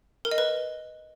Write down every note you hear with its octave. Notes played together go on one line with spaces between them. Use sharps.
A#4
D#5
B4